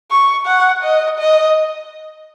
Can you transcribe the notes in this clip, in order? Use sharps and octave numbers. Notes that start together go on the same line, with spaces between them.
C#6
F#5
D#5
D#5